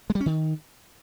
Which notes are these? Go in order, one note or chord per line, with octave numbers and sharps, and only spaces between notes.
G#3
G3
C#4
D#3